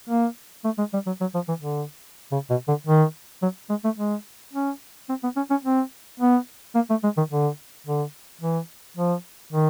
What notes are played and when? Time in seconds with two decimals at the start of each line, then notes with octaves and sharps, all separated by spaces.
0.09 A#3
0.64 A3
0.78 G#3
0.93 G3
1.07 F#3
1.21 F#3
1.34 F3
1.48 E3
1.62 D3
2.32 C#3
2.50 B2
2.68 D3
2.87 D#3
3.43 F#3
3.70 G#3
3.85 A3
3.98 G#3
4.54 C#4
5.09 C4
5.24 B3
5.37 C#4
5.51 C#4
5.64 C4
6.20 B3
6.75 A#3
6.90 A3
7.04 G#3
7.17 D#3
7.31 D3
7.87 D3
8.42 E3
8.97 F3
9.53 D#3